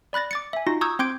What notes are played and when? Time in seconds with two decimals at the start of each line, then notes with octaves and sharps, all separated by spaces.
0.13 D5 B5 F#6 A6 A#6
0.31 D6 A6 C#7
0.53 E5 G#5
0.67 D#4 F4 F#4 A#6
0.81 A#5 C#6 D#6 E6 G6 G#6
0.99 C4 C6 D6 G6 G#6 D7